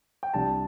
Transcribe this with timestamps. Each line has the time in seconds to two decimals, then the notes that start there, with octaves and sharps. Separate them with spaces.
0.23 G5
0.34 C2 C3 G3 D4 A5